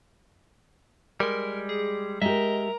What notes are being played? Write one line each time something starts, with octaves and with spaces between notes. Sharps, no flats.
G3 G#3 A#4
G#4
G#3 G4 A#4 D#5 E5 A#5